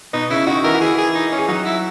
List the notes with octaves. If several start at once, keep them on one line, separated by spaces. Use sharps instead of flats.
B2 B3 D#4
C#3 C#4 E4
D#3 D#4 F#4
E3 E4 A#4
F#4
E3 E4 G#4
G#4
D#4
C#4
G#4
F#3 D#4 F#4
E4